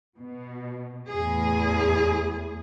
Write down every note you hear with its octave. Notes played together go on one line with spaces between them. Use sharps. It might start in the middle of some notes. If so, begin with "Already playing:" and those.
B2
E2 A2 G#4